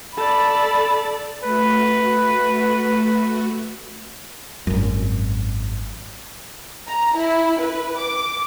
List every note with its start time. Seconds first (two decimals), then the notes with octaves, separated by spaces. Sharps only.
0.17 A4 D5 B5
1.44 A3 F#4 B4
4.67 G#1 F#2
6.87 A#5
7.16 E4
7.61 B4
7.98 D6